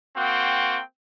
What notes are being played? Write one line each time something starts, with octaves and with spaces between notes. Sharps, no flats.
A#3 C4 F#4 G5